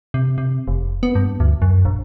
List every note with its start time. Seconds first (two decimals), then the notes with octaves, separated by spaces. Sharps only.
0.14 C3
0.38 C3
0.68 F1
1.03 B3
1.15 G2
1.40 D2
1.62 F#2
1.85 A#1